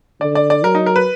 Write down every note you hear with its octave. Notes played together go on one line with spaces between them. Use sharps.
D3 D5
D5
D5
F#3 A#4
D#4
A#4
B4